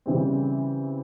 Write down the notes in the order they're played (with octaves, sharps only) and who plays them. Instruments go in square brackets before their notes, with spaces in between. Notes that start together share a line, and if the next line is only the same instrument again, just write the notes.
[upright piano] C#3 E3 G3 C4